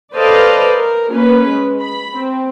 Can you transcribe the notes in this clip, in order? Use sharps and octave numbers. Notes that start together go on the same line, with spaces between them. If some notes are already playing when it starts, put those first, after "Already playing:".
A4 B4 C5 D5 D#5 F5
A#4
A#3 C#4 B4
G#3
B5
C4